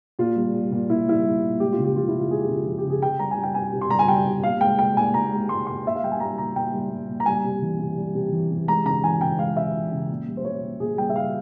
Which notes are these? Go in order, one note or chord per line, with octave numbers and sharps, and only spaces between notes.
A#2 F4
G3
G3
A#2
A#2 E4
G3 E4
G3
A#2
G#3 G4
F4
C#3
G4
F3 F4
E4
C#3
F4
G#3 G#4
G4
C#3 F4
F3 F4
G4
C#3
G#4
C3 G5
G3 A#5
G#5
G3
G5
C3 G#5
C3
C6
G3 A#5
G#5
G3 G5
C3
A#2 F5
G#3 G5
G#3 G5
A#2 G#5
A#2 A#5
G#3
G#3 C6
A#2 C6
A#2 E5
F5
G3 G5
G#5
G3 A#5
A#2 A#5
A#2 G5
G3
G3
A#2
A#5
G3 G#5
C3
E3
C3
G3
C3
E3
C3
G#3 A#5
C#3 A#5
E3 G#5
C#3 G5
G#3 F5
C#3 E5
E3
C#3
A#2
G3
C5
G3 C#5
A#2
A#2 G#4
G3 G5
E5
G3 F5